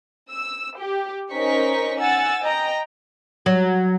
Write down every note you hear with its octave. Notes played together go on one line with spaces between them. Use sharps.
E6
G4
C#4 D#4 A#4 C5 C#6 B6
F#5 G#5 E6 A6
D#5 G5 A#5
F#3